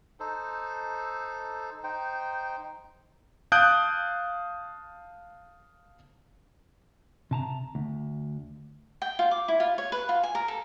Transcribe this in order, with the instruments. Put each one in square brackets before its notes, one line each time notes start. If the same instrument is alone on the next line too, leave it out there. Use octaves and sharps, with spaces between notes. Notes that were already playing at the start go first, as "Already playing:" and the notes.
[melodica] D#4 A4 C5
D#4 C5 G5
[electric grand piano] F5 A5 D#6 F#6 G6 D7
[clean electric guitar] C3 A5 A#5
D2
[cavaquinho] G5
F4
D6
E4
F4
C#5
B4
F4
G#5
A#4
A4